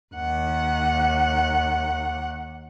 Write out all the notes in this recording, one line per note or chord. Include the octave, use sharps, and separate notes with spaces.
D#2 F#5